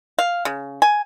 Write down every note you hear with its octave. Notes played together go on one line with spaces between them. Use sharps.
F5
C#3
G#5